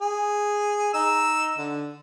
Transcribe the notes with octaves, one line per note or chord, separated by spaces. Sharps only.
G#4
D#4 E6
D3